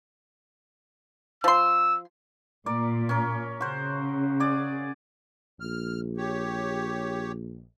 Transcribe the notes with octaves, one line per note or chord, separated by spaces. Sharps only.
F3 C6 E6
A#2 A#4 D5
C#4 A#4
C#3 F#4 C5
G#4 D5 F#5
A#1 F6
G4 C#5